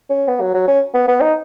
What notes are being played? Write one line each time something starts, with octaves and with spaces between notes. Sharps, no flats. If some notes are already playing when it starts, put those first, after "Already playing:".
C#4
B3
F#3
F#3
C#4
B3
B3
D#4